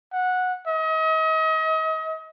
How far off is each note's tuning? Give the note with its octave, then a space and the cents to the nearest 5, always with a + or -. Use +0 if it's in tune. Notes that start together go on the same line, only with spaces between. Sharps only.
F#5 -15
D#5 +40